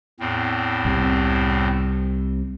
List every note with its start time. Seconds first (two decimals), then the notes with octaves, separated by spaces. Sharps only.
0.20 E2 A2 C4
0.85 C2 C3